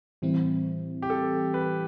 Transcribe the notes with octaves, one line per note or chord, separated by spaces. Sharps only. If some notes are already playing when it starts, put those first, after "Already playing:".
A2 E3 G3 C4 E4
G4
A4
B4